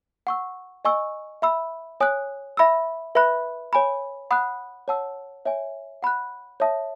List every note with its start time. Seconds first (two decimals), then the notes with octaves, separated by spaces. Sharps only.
0.27 F#5 C#6 E6
0.85 D#5 G#5 C#6 E6
1.42 E5 B5 E6
2.00 C#5 G#5 D#6 F#6
2.57 E5 B5 E6
3.15 B4 E5 B5 F#6
3.73 C#5 G#5 B5
4.31 F#5 B5 D#6 F#6
4.88 C#5 F#5 A5 E6
5.45 C#5 E5 G#5
6.03 F#5 B5 F#6
6.60 C#5 E5 A5 D#6